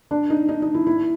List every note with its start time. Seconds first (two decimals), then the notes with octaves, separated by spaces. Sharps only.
0.11 D4
0.30 D#4
0.49 D#4
0.62 D#4
0.74 E4
0.87 E4